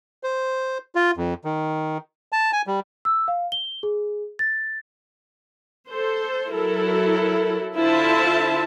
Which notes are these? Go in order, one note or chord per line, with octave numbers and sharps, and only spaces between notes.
C5
F4
F2
D#3
A5
G#5
G3
E6
F5
G7
G#4
A6
A4 C5
F#3 E4 A4 A#4
D3 E4 F4 C5 E5 A5